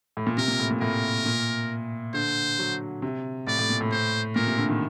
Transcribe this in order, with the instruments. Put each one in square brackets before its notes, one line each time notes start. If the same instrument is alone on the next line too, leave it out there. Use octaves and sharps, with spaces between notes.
[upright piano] A2
A#2
[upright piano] C3 [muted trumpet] A#4
[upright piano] A#2
A2
A#2
[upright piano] A2 [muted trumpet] A#4
[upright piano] A#2
[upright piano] D3 [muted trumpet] C5
[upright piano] F#3
C3
[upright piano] A2 [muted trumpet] D5
[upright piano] A2
A#2
A2
[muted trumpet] C5
[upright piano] A#2 [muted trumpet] A#4
[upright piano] C3
D3
D#3